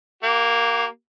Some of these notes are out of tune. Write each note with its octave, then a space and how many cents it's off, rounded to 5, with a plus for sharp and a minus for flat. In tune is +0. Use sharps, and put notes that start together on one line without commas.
A#3 +0 G4 -45